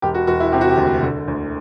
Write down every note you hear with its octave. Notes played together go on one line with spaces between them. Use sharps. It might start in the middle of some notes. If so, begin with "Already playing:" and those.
E1 G4
F#4
E1 F#4
E4
C3 G4
F#4
G4
D2
D3
D2